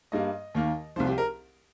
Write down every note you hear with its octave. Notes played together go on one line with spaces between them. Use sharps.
G2 G3 A#3 D#5
D#2 D#3 A#3
C2 C3 F3 C5
G4
A#4